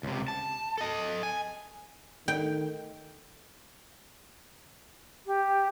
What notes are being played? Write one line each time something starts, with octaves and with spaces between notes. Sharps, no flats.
C#2 C3
A5
A4 D#5
G#5
D#3 G5
G4